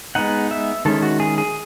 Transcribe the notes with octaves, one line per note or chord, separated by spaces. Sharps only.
G#3 B3 D#4 F#5
E5
D#3 G#3 C#4 E4 A4
F#4
G#4
G#4